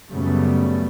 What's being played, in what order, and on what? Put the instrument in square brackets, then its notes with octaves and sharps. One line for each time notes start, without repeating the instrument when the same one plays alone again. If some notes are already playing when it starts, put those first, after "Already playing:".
[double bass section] F#2 C#3 G3 A3 B3